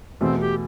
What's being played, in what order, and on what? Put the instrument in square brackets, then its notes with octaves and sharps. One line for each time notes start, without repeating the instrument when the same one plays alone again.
[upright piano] E2 B2 A3 [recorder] C4
[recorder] G4